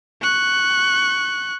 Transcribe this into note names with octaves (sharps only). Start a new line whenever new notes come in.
C#6 F#6